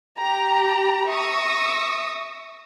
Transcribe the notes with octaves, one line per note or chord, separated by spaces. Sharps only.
G4 A#5
E5 C#6 D#6 E6 A#6